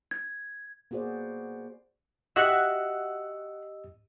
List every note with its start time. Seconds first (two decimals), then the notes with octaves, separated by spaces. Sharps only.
0.11 G#6
0.91 A#3 B3 F#4 G#4 C5 D5
2.36 F#4 G4 D#5 E5 F#5 E6